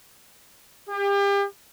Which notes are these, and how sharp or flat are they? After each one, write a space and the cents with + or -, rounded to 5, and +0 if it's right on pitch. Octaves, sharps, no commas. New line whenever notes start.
G4 +35